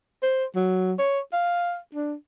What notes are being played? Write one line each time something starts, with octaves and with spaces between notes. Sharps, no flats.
C5
F#3
C#5
F5
D4